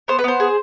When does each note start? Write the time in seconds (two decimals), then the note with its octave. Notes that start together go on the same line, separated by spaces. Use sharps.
0.08 B3 C5
0.19 B4
0.24 B3 C5
0.40 G#4